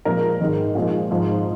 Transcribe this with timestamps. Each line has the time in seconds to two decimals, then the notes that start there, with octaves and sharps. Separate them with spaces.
0.05 A#2 F3 G#3 A#4
0.40 G#2 D#3 G#3
0.75 A#2 F3 G#3
1.11 G#2 F3 G#3